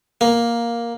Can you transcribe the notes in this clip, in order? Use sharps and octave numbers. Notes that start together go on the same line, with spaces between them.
A#3